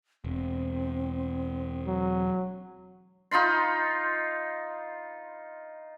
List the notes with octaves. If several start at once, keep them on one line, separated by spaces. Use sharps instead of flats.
E1 C4
F#3
D#4 F4 B5 C6